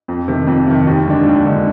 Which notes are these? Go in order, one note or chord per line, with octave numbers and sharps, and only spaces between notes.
F2
C3 D#3
F2
C3 D#3
D#2
D3 G#3 D4
D#2
D3 G#3 D4